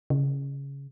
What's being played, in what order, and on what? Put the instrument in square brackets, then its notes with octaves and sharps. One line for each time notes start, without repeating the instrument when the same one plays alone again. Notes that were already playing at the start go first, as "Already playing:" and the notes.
[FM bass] C#3